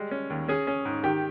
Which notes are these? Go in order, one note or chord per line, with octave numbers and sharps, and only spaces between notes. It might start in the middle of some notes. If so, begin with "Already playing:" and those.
Already playing: G3 G#3
C#4
D#2
C#4 G#4
C#4
G#2
D#3 G4